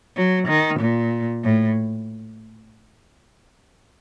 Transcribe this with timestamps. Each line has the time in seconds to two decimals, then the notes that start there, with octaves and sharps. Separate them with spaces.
0.16 F#3
0.48 D#3
0.80 A#2
1.44 A2